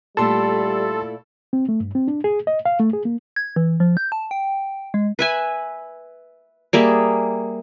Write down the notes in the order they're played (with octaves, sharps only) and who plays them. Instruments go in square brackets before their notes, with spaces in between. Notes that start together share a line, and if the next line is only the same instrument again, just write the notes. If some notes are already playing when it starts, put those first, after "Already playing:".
[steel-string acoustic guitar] A#2 A3 E4 [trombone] G3 [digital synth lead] A4 [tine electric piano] A5 C6
[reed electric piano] C4
A3
G2
C4
D4
G#4
D#5
F5
A3
G#4
A#3
[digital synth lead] G#6
E3
F3
G6
A5
G5
G#3
[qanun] B4 E5 G#5
G3 A#3 G#4 E5